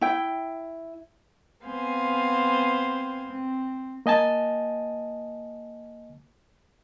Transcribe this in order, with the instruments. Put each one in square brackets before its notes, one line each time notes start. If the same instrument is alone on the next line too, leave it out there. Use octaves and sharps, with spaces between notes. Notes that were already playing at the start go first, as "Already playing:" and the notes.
[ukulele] E4 G5
[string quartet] B3 C4 C5 F5 G#5
C4
[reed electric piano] A#3 D#5 G#5 A5